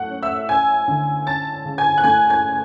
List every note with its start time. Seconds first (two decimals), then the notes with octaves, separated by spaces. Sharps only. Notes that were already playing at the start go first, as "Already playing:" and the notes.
Already playing: F#2 A3 F#5 F#6
0.10 C#4
0.23 E5 E6
0.49 C#4 G#5 G#6
0.88 D3
1.26 C#4 A5 A6
1.65 C#3
1.78 G#5 G#6
1.98 F#6
2.04 A3 G#5 G#6
2.30 G#5 G#6